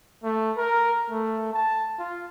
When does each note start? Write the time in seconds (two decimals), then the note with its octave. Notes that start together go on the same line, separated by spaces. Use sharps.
0.23 A3
0.57 A#4
1.10 A3
1.53 A5
1.99 F4